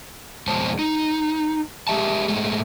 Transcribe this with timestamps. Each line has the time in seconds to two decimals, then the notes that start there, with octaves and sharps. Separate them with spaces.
0.47 F2 B2 G#3 C5 A5
0.79 D#4
1.88 G#3 G4 E5 A5
2.28 A2 G#3 A3